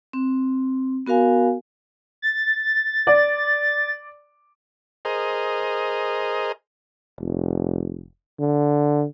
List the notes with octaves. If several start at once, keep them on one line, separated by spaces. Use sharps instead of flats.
C4
B3 F#4 A#4 F5 G#5
A6
D5
G#4 A#4 C5 D#5
F1
D3